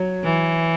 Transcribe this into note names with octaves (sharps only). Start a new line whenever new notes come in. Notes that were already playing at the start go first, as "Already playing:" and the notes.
Already playing: F#3 C#5
E3